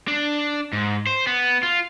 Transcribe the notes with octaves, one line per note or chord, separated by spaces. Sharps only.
D4
G#2
C5
B3
F4